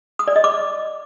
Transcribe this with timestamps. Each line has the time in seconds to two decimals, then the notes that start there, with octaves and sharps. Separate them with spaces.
0.19 D#6
0.28 D5
0.36 D#5
0.44 D6